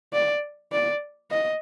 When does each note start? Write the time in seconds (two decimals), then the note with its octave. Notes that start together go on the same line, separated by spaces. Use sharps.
0.14 D5
0.72 D5
1.31 D#5